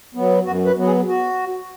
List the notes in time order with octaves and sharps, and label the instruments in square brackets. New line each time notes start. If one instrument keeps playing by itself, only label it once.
[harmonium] F#3 B3
F#2 F#4
B4
F#3 B3
G#4
F#4